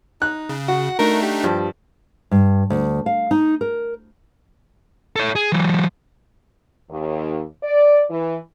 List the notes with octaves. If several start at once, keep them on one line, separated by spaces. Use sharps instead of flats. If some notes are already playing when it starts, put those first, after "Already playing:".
D#4 F#6
C#3
F#4 F#5
A3 D4 D#4 A#4
G4
G2 F3
G2
D2
F5
D#4
A#4
A4 C#5
G#4
E3 F#3
D#2
D5
E3